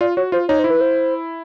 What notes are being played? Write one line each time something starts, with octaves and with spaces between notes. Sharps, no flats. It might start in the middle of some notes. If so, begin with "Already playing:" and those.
F4 D5
F#4 C#5
F4 C5
D#4 C#5
E4 C5
B4
C5